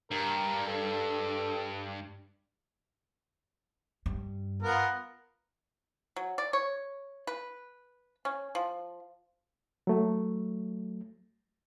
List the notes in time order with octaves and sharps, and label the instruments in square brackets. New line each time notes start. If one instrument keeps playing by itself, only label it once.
[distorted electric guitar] G2 [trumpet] A#4
[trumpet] A4
[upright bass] G2
[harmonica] B3 F4 A#4
[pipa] F#3
D5
C#5
B4
C#4
F3
[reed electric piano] F#3 A3